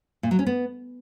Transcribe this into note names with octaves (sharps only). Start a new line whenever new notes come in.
A#2
F#3
C#4
B3